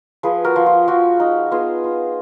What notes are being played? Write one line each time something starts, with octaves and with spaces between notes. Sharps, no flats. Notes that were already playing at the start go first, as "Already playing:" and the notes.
F3 G#4 B4
F#4 A#4
F3
F4
F3 F#4
D#4
B3 F4 G#4
F4